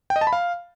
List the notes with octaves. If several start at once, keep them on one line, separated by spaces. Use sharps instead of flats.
G5
D#5
A5
B5
F5